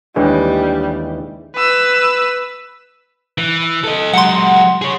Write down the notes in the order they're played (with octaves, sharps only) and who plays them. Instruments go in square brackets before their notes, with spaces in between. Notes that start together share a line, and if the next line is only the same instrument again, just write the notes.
[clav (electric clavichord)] D#2 E3 G#3 [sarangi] G3 [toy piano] D4 C#5
[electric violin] B4 E6
[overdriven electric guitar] E3
A4 D#5
[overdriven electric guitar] F#3 G#3 [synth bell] F#5 C6
[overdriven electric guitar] G#4 C#5